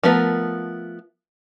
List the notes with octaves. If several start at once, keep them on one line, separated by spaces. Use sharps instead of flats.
F3 A3 B3 A#4